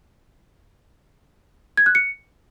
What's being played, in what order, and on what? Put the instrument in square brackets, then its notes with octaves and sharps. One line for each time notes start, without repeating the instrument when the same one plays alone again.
[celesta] G#6
F#6
C#7